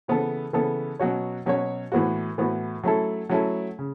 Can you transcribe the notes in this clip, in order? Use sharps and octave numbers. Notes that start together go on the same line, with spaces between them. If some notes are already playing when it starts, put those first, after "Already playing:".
C#3 E3 B3 A4
C#3 E3 B3 A4
B2 F#3 C#4 F#4 C#5
B2 F#3 C#4 F#4 C#5
A2 E3 B3 F#4
A2 E3 B3 F#4
F#3 A3 C#4 E4 A4
F#3 A3 C#4 E4 A4
C#3